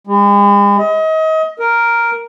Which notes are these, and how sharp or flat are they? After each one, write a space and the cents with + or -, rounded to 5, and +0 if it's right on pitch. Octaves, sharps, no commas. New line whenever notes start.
G#3 -45
D#5 +30
A#4 +0